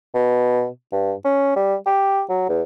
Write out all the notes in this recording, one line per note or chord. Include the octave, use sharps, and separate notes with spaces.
B2
G2
C#4
G3
G4
F#3
E2